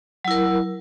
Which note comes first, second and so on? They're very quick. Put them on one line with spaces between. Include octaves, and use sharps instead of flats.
F#3 E4 A#4